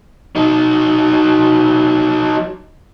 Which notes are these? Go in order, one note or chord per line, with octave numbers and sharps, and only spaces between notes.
F#3 D#4